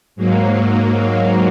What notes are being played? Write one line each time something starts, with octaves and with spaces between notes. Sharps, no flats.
G#2 F#3 A#3